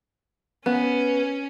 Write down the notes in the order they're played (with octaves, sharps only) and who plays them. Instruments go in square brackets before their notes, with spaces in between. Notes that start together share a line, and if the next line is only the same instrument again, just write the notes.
[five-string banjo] B3 [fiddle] C#4